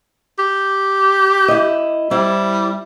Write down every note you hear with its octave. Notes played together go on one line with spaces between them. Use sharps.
G4
E4 D#5
G3 C4 E4